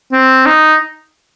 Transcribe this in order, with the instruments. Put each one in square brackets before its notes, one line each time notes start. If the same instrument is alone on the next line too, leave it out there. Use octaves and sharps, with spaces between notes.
[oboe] C4
D#4